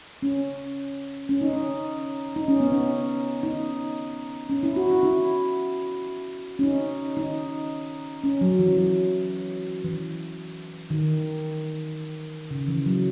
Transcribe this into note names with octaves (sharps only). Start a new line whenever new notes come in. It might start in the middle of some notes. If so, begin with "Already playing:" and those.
C#4
C#4
D#4
C#4
D#4
C#4
B3
C#4
D#4
C#4
E4
F#4
E4
E4
C#4
D#4
D#4
C#4
F#3
E3
F#3
E3
D#3
C#3
E3
F#3